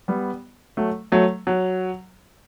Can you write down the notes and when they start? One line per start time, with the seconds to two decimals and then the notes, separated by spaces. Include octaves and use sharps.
0.08 G3 B3
0.77 F#3 A3
1.12 F#3 A3
1.47 F#3